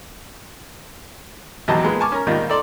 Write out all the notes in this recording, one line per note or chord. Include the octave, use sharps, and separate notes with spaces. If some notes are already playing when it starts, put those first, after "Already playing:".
G#1 E2 F#3 G4 D#5 A5
A#2 G#3 B3
G#5 A5 C#6 D6 F6
C#4 A#4 A#5
D#2 G#2 D#3 G3 F4
D#4 A4 D5 C6